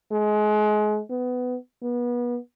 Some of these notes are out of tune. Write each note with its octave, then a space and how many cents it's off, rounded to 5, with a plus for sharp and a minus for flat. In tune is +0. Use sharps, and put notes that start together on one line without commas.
G#3 +30
B3 +15
B3 -30